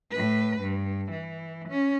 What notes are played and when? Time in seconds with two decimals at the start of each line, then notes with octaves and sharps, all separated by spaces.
0.11 A2 B4
0.61 G2
1.11 E3
1.69 C#4